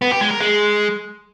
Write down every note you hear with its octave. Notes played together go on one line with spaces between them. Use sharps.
B3
G4
G#3
A#4
G#3